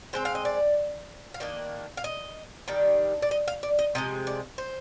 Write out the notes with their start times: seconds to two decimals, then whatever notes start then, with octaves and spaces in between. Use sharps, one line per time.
0.13 D3 G#3 C4 C5
0.25 F5
0.35 D#5
0.45 D5
1.34 F5
1.40 D#3 A#3 D4 D#5
1.97 F5
2.04 D#5
2.68 D#3 G3 D4
3.22 D5
3.31 D#5
3.48 F5
3.63 D5
3.79 D#5
3.95 C3 F3 G#3 D#5
4.27 D5
4.58 C5